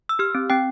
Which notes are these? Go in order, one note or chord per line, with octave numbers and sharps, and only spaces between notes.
E6
G4 F6
C4
C4 G5